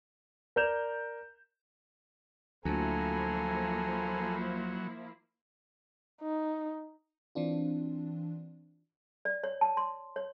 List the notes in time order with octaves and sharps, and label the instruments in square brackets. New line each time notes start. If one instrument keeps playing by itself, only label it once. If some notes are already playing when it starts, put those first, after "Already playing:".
[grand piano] A#4 D5 G6 E7 F7
[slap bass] D2 [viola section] F3 A#3 E4 [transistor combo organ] F#3 [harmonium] A4 G#5 A#5
[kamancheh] D#4
[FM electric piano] E3 C4 D4 F4
[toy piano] D5
C#5
A5
C6
C#5